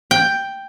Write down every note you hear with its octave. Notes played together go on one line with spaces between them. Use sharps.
G5